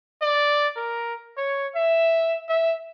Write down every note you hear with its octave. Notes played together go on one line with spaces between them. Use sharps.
D5
A#4
C#5
E5
E5